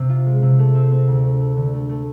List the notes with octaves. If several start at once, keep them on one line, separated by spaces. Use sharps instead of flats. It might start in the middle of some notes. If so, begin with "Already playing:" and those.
Already playing: C3
F4
G#3
C3
A3
C4
C4
D2
A3
A3
D3
A3
A3